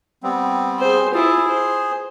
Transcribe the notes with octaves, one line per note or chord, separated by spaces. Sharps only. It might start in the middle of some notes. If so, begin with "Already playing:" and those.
G3 B3 C4
G#4 C5
E4 F4 G#4
C5